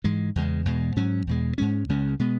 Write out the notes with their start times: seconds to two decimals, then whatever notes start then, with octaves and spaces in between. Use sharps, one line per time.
0.04 G#2 E3 G#3
0.36 E2 C#3 G#3
0.65 E2 B2 G#3
0.96 G#2 F#3 C#4
1.27 E2 B2 G#3
1.58 G#2 G#3 C#4
1.89 C#2 C#3 G#3 C#4
2.20 B2 G#3 B3